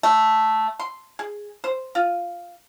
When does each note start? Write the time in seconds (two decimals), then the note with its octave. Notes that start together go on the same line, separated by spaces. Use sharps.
0.03 A3
0.79 C6
1.19 G#4
1.64 C5
1.95 F4